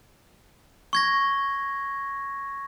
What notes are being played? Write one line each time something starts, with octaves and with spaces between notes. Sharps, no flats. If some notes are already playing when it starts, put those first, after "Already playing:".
C#6 G#6 A#6